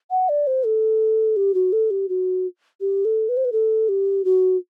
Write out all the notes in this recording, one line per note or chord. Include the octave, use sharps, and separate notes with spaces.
F#5
D5
C5
A4
G4
F#4
A4
G4
F#4
G4
A4
B4
C5
B4
A4
G4
F#4